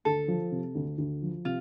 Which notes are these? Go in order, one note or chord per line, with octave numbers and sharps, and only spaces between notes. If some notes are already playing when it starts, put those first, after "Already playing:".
D2 A4
F3
C3
D2
D2
F3
C3 F4